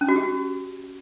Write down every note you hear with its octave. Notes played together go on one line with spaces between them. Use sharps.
C#4
F#4
G4
F#4